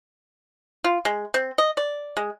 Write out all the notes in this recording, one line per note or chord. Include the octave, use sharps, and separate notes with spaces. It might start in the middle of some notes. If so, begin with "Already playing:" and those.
F4
G#3
C4
D#5
D5
G#3